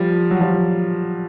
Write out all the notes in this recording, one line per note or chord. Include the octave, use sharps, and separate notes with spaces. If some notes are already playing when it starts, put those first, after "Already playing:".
Already playing: F3 G3
F#3
F3 G3